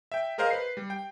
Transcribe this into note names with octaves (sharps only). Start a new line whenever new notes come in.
E5 G5
G#4 A#4 C5 D#5 F5
B4 C7
G3
G5